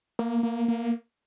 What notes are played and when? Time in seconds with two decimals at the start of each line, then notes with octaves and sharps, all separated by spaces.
0.19 A#3
0.43 A#3
0.68 A#3